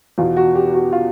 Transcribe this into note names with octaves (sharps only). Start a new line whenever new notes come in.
E2 B2 F4
F#4
G4
F#4
F4